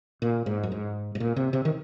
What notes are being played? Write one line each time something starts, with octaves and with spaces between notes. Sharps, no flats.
A#2
G#2
F#2
G#2
G#2
A#2
C3
C3
D#3